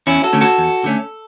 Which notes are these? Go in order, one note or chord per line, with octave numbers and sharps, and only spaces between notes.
E2 C#4 E4
F#4 A4
D3 A3 C#4
F#4 A4
E2
D3 A3 C#4